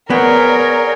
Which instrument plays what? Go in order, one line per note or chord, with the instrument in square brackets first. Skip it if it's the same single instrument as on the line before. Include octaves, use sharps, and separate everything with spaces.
[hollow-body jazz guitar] B3 [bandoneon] G#4 C#5 G5 [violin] A#4 [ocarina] D5